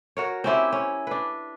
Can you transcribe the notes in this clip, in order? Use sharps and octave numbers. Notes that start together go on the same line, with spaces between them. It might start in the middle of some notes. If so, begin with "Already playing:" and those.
F#4 A#4 C#5
C4 C#4 E4 G4
C#4
D4 B4